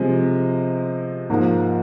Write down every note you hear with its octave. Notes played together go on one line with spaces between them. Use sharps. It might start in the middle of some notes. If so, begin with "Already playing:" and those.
Already playing: C3 F3 G#3 C4
G#2 F3 A#3